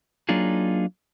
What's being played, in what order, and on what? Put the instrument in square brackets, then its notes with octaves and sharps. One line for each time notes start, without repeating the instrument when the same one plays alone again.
[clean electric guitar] F#3 A#3 D4 D#4 F4 G#4